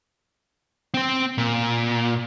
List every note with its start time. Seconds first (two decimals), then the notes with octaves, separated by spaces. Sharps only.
0.94 C4 C5
1.38 A#2